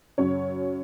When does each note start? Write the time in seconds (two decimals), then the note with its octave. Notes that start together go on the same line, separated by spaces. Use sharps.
0.18 F#2 C#3 F#3 C#5